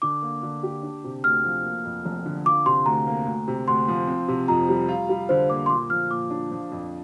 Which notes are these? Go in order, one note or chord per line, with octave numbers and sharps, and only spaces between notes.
D3 D6
A#3
D3
G4
D4
C3
D2 F6
F3
A#3
F2
F1
D3
F4 D6
C3 C6
D2 A#5
A#3
D2
C3
D2 C6
F3
C4
C3
F2 A#5
G3
F4
G3
D3 C5
A#3 D6
C6
A#2 D6
F3 F6
A#2 D6
D4
F3
F2